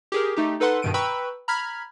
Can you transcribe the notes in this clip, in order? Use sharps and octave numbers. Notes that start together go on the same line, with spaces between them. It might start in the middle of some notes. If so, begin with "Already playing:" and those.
G4 G#4 A#4
A3 D#4 G4
D#4 A4 B4 F#5 C6
G2 B2 D#3 D7 D#7
B4 G5 A#5 B5 C#6 E6
A#5 B5 F6 G#6 B6